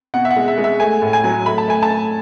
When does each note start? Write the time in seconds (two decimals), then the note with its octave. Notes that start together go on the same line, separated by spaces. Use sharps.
0.14 B2 F#5
0.25 E5
0.31 F#5
0.36 G#3
0.48 E5
0.58 G#3
0.64 E5
0.80 A3 G#5
1.02 A2
1.13 G#5
1.24 F#3
1.46 A3 B5
1.58 A5
1.68 A3 G#5
1.83 A5
1.90 A3